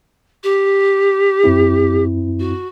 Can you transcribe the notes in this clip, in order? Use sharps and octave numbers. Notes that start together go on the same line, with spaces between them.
G4
F#2 C4 E4
F#4